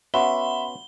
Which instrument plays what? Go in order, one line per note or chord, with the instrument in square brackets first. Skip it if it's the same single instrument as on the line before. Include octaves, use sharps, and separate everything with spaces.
[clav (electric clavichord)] B3 C#4 F#4 [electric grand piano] E5 [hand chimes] F#5 B5 C6 [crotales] G7